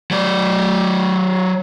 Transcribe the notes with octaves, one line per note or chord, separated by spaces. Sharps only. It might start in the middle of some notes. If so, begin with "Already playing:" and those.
F#3 D5